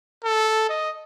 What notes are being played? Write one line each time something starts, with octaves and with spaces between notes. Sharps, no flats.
A4
D#5